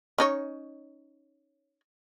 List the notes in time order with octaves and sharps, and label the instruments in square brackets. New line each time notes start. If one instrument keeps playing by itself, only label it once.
[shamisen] C#4 D#4 C#5